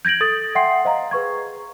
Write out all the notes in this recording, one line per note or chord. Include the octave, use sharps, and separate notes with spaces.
G6 G#6 A#6 D7 F#7
A4 D#6 A6
E5 F#5 G5 C6 C7
C5 D#5 F5 A#5
G#4 B4 C#6 G#6